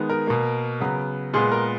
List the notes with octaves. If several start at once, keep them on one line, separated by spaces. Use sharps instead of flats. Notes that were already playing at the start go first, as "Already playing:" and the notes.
Already playing: D#3 G#3 B3
A#4
B2 A#3
C#3 F#3 B3
A#2 G#3 B3 G#4
A#4